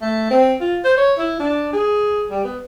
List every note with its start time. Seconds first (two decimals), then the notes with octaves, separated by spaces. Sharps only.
0.02 A3
0.31 C4
0.61 F4
0.84 C5
0.98 C#5
1.19 E4
1.40 D4
1.73 G#4
2.30 G3
2.44 B3